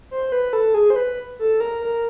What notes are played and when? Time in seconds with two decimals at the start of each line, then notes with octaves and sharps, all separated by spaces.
0.11 C5
0.32 B4
0.53 A4
0.74 G#4
0.90 C5
0.96 B4
1.39 A4
1.60 A#4
1.81 A#4